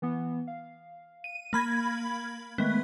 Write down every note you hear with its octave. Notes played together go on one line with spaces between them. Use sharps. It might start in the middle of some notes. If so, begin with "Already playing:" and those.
E3 B3
F5
D#7
A#3 B5 G#6
D#3 G#3 A3 B3